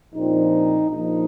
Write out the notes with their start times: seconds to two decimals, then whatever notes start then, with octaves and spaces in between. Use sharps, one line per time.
0.13 A#1 A#2 F3 C4 D#4
0.90 A#1 A#2 F3 D#4